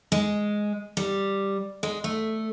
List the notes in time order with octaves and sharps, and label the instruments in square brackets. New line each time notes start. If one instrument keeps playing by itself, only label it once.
[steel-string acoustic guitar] G#3
G3
G#3
A3